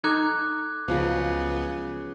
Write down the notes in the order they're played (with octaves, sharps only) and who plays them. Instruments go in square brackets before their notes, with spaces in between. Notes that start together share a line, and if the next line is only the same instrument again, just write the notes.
[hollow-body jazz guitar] D#4 A4 A#5 [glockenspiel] D6 F#6 G#6
[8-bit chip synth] C#2 B3 [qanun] C#3 F3 F#3